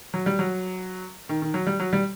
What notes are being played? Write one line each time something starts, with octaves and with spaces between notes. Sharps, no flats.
F#3
G3
F#3
D#3
D#3
F#3
G3
F#3
G3